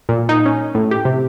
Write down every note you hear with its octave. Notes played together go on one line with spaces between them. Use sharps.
A#2
D#4
C#4
A2
G4
C3